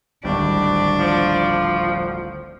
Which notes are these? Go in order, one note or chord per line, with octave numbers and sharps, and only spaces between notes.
D1 G#1 G3 D4
F3